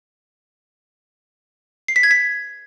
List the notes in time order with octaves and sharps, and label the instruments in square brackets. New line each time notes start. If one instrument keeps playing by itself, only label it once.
[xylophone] C7
B6
G#6
B6